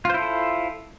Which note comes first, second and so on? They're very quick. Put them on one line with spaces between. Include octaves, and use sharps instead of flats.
F4 C5 E4 A4